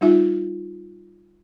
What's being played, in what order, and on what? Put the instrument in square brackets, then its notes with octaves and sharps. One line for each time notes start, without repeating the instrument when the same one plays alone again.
[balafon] G3 D#4 F4 E5